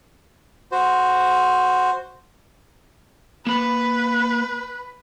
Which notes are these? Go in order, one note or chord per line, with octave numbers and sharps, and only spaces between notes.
F#4 C5
A#3 B4 B5